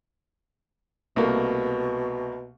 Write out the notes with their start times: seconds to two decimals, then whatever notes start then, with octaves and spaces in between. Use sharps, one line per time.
1.16 C2 B2 A3 A#3